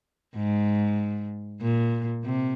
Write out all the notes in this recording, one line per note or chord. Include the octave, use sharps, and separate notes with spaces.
G#2
A#2
C3